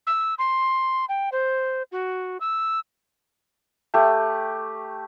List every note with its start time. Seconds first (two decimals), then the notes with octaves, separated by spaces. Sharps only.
0.07 E6
0.38 C6
1.09 G5
1.32 C5
1.92 F#4
2.40 E6
3.94 A3 G4